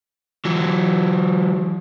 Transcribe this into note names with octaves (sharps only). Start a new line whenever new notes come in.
E3 F#3